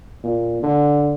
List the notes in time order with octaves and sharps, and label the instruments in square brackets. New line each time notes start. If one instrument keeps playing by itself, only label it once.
[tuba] A#2
D3